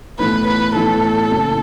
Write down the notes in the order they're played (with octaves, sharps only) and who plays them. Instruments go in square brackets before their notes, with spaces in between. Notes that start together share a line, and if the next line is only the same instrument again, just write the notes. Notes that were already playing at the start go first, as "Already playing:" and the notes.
[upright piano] B1 A2 E3 A3 [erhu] B4
[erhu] B4
[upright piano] B1 A2 E3 A3 [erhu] A4
[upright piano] F#1 F#2 C#3